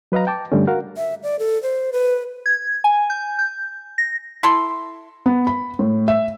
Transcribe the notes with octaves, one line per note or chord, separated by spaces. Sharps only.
F#3 B4 D#5 F5 A#5
G5 A5 D6
G2 D3 G3 A3 C#4
F#4 A#4 F5 F#5
E5
D5
A4
C5
B4
G#6
G#5
G6
G6
A#6
E4 A4 C6
B3
B5
A2
E5